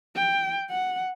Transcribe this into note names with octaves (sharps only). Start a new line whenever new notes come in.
G5
F#5